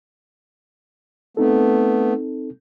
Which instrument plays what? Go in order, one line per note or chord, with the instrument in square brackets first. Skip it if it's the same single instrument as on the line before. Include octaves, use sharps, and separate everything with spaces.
[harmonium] A3 B3 [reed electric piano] C4 D#4 A4